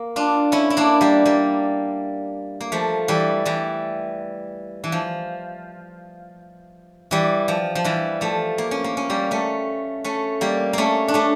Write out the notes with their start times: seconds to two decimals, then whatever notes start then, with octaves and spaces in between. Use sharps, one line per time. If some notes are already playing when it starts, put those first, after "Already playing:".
Already playing: A#3
0.16 D4 F4
0.52 C#4 E4
0.70 E4
0.77 A#3 D4
1.01 G3 A#3
1.25 G3 A#3
2.61 A#3
2.72 F3 A3
3.08 E3 G3
3.45 E3 G3
4.84 E3
4.92 F3
7.11 E3 G3
7.48 F3
7.75 F3
7.84 E3 G3
8.21 F3 A3
8.58 A#3
8.71 C#4
8.84 A#3
8.97 C#4
9.10 G3 A#3
9.31 A3 C#4
10.04 A3 C#4
10.41 G3 A#3
10.73 A3 A#3 C#4
11.08 D4
11.14 A3 C#4